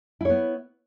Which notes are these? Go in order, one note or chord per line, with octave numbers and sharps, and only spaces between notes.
B3 E4 C#5